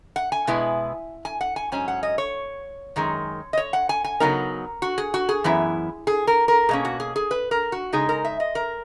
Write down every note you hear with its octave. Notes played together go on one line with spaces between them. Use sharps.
F#5
G#5
B2 G#3 B3 E4
G#5
F#5
G#5
G#2 F#3 C#4 G#5
F#5
D#5
C#5
F#2 D#3 G#3
D#5
C#5
F#5
G#5
G#5
C#3 F#3 B3 D#4 A#4
F#4
G#4
F#4
G#4
F#2 E3 B3 E4
G#4
A#4
A#4
B2 A#3 C#4 G#4
F#4
G#4
G#4
B4
A#4
F#4
C#3 G#3 D#4 G#4
A#4
E5
D#5
A#4